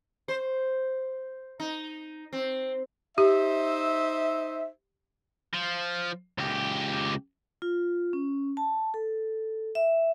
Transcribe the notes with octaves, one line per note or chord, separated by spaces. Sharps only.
C5
D#4
C4
D#4 G4 C5 E5
F3
C#2 G4
F4
C#4
A5
A4
E5